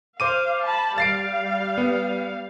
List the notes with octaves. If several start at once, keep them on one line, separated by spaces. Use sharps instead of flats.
C5 F5 D6 D#7
A5 B5
G3 F5 A6 C7 D7
B3